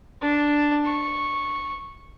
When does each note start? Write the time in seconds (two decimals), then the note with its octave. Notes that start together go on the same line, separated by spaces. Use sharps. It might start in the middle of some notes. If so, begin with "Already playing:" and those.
0.22 D4
0.85 C#6